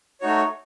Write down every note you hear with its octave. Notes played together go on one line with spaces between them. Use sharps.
A3 D#4 F#4 C#5